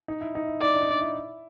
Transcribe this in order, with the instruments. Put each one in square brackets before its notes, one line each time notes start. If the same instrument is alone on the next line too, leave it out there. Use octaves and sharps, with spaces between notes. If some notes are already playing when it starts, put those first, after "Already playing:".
[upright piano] D#4
E4
D#4
E4
[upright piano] D#4 [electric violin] D5
[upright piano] D4
D#4
D4
E4